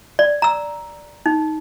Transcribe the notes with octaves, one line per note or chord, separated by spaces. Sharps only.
D5
A#5 E6
D#4